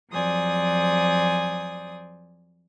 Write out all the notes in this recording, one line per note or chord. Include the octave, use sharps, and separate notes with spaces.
F2 F#3 C5 D5 G#5 D#6